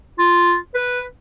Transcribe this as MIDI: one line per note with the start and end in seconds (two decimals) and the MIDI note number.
0.19 0.56 65
0.75 1.01 71